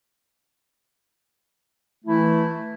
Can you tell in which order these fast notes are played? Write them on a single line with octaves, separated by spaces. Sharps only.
A3 E4 E3